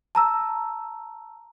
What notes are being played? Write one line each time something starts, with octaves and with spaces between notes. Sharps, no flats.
A5 A#5 E6